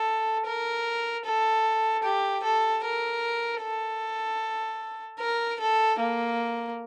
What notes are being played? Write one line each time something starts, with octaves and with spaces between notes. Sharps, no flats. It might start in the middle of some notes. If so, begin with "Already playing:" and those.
Already playing: A4
A#4
A4
G4
A4
A#4
A4
A#4
A4
A#3